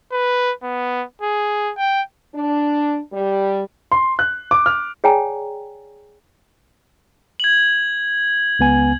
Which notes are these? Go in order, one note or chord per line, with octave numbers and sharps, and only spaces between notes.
B4
B3
G#4
G5
D4
G3
C6
F#6
D6
F6
G#4 C#5 D5 G5 G#5 A#5
G#6 F#7
C#2 B3 G#5